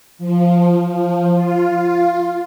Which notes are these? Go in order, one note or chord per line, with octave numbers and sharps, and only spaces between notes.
F3
F3
F4